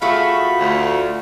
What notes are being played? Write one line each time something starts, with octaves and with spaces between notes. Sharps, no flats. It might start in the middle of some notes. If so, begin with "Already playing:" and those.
A3 F4 F#4 G#4 E5 F5 B5
D2